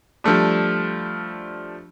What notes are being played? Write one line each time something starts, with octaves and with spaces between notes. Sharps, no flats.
F3 G3 A3 D4